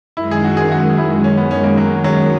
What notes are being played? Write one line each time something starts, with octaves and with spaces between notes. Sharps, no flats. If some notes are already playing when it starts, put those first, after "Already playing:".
F#2 D#3 G#3 E4
G#4
F#4
G#4
F#4
E4
C#4
B3
C#4
A#3
F#3
F#3